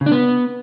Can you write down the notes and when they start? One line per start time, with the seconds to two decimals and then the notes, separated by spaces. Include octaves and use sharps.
0.01 C#3
0.06 D4
0.12 B3